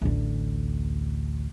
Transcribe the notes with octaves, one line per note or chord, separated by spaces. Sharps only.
A1 D2